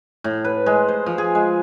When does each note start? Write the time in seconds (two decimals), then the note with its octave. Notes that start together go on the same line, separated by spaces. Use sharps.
0.24 A2
0.45 B4
0.66 G#3
0.88 C5
1.06 F3
1.18 G#4
1.35 G#3